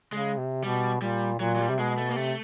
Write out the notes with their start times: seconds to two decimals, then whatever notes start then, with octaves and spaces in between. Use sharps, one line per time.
0.13 C#3 G#3
0.38 C3
0.64 B2 G3
1.01 A#2 G3
1.40 A#2 F#3
1.55 F#3
1.59 G3
1.70 C3
1.79 B2 G#3
1.97 A3
2.09 A#3
2.16 C3 A3